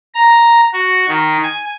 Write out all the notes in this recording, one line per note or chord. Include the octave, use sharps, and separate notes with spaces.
A#5
F#4
D#3
G#5